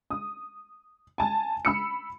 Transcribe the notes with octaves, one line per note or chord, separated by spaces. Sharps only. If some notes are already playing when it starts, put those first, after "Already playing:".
D#6
G#5 A5
B5 E6 C#7